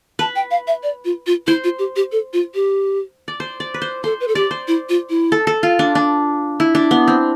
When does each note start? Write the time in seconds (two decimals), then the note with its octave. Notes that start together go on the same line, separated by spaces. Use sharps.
0.19 B4 A5
0.36 G5
0.51 F5
0.67 E5
0.83 D5
1.05 F4
1.27 F4
1.47 E4 C5
1.64 F4
1.79 G4
1.96 G4
2.12 A4
2.33 F4
2.55 G4
3.28 D5
3.40 C5
3.60 D5
3.74 B4
3.82 C5
4.04 A4 C5
4.20 B4
4.28 A4
4.35 G4 D5
4.51 C5
4.68 E4
4.89 F4
5.10 E4
5.32 A4
5.47 A4
5.63 F4
5.79 D4
5.95 D4
6.60 E4
6.75 D4
6.91 B3
7.08 C4